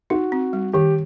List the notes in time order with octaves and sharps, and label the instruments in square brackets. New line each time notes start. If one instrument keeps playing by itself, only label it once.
[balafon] D#4 [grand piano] F#4
[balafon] C4
G3
[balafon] D#3 [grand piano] G4